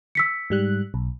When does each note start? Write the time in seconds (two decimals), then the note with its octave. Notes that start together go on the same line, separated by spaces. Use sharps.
0.15 E6 B6 C#7
0.50 G#2 G3 F#6
0.94 B1